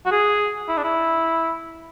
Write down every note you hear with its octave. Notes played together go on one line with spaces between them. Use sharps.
F#4
G#4
E4
D4
E4